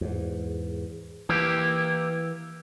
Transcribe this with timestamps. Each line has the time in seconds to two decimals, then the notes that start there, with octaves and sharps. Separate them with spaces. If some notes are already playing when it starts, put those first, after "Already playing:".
0.01 E2 G#2
1.29 E3 A#3 E4 G4